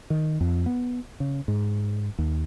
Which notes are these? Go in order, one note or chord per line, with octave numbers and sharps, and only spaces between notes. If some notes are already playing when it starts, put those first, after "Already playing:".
D#3
F2
B3
C#3
G#2
D#2